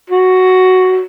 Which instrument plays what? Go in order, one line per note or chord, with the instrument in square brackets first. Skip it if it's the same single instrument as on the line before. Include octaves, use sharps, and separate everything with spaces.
[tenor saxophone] F#4